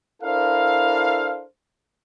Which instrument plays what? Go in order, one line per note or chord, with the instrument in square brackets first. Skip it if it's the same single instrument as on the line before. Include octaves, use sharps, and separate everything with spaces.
[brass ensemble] D4 E4 A4 A#4 C5 F5